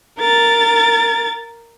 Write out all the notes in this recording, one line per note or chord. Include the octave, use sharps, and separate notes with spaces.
A#4 A6